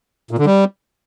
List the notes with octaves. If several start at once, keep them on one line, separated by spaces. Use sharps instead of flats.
A#2
D3
G3